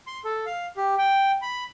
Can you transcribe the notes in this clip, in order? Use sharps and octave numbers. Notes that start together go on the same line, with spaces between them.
C6
A4
F5
G4
G5
B5